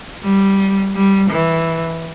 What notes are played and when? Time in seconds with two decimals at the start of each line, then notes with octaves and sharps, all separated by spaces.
0.24 G3
0.95 G3
1.31 E3